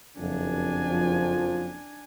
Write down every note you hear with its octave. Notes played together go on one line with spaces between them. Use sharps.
F#1 F2 D4 G#5
F3